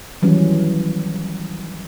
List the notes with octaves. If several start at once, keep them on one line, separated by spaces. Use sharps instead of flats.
D#3 E3 F#3 G3 C#4